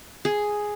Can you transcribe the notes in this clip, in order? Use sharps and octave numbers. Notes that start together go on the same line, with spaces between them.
G#4